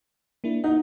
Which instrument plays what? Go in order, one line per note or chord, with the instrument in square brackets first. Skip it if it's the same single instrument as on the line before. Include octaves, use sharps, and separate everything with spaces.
[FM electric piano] A#3 D4 E4
[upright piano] D#4 [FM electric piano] F#5